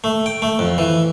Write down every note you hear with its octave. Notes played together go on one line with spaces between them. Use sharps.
A3
G5
A3
F2
E3